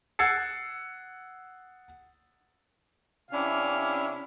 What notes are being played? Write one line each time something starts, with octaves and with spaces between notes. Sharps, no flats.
F#5 E6 G#6 A6 C7 C#7
C3 C#4 D4 E4 D5 F5